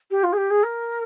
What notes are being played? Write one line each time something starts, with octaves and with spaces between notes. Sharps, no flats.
G4
F4
G#4
G4
G#4
A#4